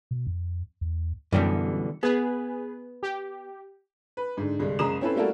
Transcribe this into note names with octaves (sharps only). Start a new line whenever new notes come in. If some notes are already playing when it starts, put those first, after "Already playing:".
B2
F2
E2
F#2 B2 D3 E3 G3
B3 G#4 B4
G4
B4
G#2 D3
C2 G2 D3 G#3
F#1 G#3 A#5 D#6 E7
C4 C#4 E4 A4 B4
G3 A3 A#3 E4 F#4 A4